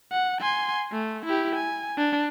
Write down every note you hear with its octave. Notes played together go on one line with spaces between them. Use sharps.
F#5
G#5 C6
A3
E4 G4
G#5
D4